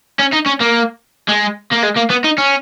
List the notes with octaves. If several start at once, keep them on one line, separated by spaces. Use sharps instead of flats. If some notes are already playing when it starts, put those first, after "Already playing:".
C#4
D#4
C#4
A#3
G#3
A#3
G#3
A#3
B3
D#4
C#4